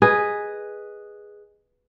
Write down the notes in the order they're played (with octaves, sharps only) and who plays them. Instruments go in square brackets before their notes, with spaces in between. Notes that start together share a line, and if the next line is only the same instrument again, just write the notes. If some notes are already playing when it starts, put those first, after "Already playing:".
[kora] G#4 B4 D#5